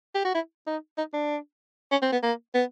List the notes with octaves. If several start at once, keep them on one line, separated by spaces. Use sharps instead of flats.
G4
F#4
E4
D#4
D#4
D4
C#4
C4
B3
A#3
B3